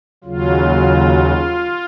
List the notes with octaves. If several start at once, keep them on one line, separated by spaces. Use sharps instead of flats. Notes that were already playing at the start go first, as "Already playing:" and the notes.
D#2 C#3 F#3 F4